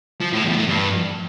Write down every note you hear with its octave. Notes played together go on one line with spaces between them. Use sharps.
F3
A2
E2
A2
G2